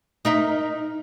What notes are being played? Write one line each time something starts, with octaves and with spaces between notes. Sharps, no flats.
D#4 A#4 E5